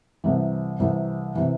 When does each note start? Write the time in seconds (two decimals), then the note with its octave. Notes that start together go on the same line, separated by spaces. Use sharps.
0.24 C2 C3 E3
0.80 C2 C3 E3
1.35 C3 E3